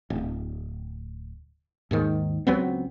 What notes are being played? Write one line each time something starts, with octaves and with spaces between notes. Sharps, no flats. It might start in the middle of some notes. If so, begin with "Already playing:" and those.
D1
D#2 G#2 D#3
C#2 F#3 B3 C4